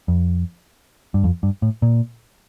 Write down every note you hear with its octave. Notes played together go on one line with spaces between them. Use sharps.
F2
G2
F2
G2
A2
A#2